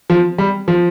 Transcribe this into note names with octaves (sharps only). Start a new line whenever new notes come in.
F3
G3
F3